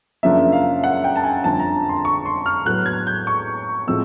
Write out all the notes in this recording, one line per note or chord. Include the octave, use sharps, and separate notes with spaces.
F#2 C#3 F3 A#3 D4 E5
F5
F#5
G5
A5
G#5
G1 F2 D3 F3 A5
A#5
C6
C#6
C6
F6
A2 F#3 B3 F#6
G#6
G6
C#6
A2 F3 G#3 C4 E6